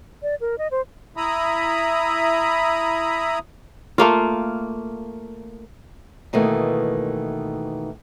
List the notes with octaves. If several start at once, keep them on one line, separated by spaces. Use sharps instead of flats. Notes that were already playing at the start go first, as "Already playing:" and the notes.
D5
A#4
D#5
C5
E4 E5 A#5 B5 D#6
A3 A#3 F4
B2 D#3 E3 A3 A#3